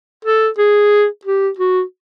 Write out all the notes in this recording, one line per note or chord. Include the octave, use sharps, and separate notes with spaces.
A4
G#4
G4
F#4